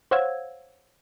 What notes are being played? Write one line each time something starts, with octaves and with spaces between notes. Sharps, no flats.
C5 C#5 F5 F#5 E6 G#6